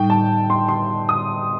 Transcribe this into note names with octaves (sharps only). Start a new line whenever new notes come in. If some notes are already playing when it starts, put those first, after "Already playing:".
Already playing: A2 G3 D#4 G5
A5
C6
C6
D#6